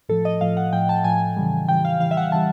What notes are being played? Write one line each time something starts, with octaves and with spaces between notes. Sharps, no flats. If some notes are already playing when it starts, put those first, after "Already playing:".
A2 F3 A4
D#5
A2 F3 F5
F#5
A2 F3 G5
A5
A2 F3 G#5
C#3 E3 G3
C#3 E3 G3 G5
F5
C#3 E3 G3 F5
E5
F#5
F5
C#3 E3 G3 A5